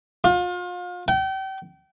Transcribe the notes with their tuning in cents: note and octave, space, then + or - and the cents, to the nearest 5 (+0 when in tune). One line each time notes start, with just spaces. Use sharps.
F4 +35
G5 -35